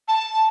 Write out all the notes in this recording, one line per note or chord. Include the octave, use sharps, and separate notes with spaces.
A5